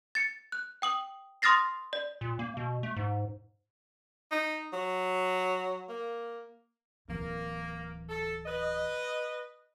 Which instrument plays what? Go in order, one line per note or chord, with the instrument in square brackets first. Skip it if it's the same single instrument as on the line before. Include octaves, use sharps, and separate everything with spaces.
[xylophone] A6 C#7
F#6
G5 D#6 F#7
C6 D#6 F6 A6 A#6 C7
D5
[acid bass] A#2
A#3
B2
A3
G#2
[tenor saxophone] D#4
F#3
A#3
[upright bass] D1 E3 [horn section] A#3
[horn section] A4
B4 D#5